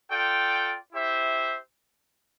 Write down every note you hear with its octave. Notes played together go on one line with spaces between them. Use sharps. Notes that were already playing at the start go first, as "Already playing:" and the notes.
F4 A4 D5 G5
E4 G4 C5 E5